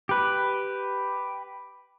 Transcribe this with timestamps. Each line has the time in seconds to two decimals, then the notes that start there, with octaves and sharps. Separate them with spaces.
0.09 G4 B4